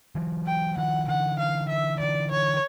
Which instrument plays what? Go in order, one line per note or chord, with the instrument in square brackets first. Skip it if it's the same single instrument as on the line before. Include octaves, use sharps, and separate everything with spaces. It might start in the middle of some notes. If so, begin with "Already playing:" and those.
[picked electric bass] E3 F#3
[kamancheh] G5
[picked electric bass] D#3 F3 [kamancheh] F#5
[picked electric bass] D3 E3 [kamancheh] F#5
[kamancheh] F5
E5
[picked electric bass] D3 E3 [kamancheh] D5
[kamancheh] C#5